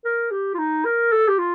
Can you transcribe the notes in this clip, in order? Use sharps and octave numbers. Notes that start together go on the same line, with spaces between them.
A#4
G4
F4
D#4
A#4
A4
G4
F4